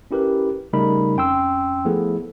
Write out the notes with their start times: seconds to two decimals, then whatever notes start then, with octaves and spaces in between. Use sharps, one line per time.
0.11 C#4 E4 G4 A#4 B4
0.73 C#3 G3 A3 D#4 A#4 B5
1.16 F2 C#4 G5 C6 E6
1.85 F3 A3 B3 E4 G#4 A4